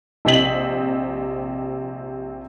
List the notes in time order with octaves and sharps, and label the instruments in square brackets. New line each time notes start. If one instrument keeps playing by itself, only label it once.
[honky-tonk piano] A#1 C3 C4 D#5 B6 F#7